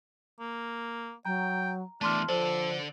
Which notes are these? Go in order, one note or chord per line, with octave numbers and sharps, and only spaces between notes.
A#3
F#3 G5 A#5
E2 E3 A3 D4 A5 C6 F6
D3 F3 A4 C5 D5